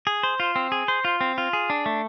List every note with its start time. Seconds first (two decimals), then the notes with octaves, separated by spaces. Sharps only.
0.07 G#4
0.23 C5
0.40 F4
0.56 C4
0.72 G#4
0.88 C5
1.05 F4
1.21 C4
1.38 F4
1.53 G#4
1.70 D4
1.86 A3